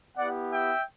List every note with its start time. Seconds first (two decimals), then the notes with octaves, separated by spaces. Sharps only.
0.17 B3 E4 G4 D5 F#5
0.52 E5 G5